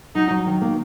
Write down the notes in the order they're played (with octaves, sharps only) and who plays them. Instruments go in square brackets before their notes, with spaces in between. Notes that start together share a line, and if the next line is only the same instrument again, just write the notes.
[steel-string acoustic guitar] F#3 [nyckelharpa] D#4
[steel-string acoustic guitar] F#3
D#3
A#3